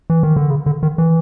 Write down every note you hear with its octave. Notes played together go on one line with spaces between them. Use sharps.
E3
D#3
D3
C#3
D3
D#3
E3